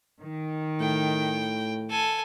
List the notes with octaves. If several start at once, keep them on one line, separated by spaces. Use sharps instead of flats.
D#3
A2 G5
A4 G#5